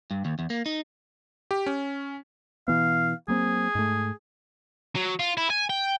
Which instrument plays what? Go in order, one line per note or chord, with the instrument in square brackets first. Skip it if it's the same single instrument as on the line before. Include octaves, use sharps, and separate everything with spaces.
[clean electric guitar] G2
D#2
E2
A#3
D#4
[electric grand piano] G4
C#4
[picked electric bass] B2 E3 B3 [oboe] F5
[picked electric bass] F#3 A#3 C4 [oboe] G#4
[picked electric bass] G#2 A3
[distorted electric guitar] F#3
F4
E4
G#5
G5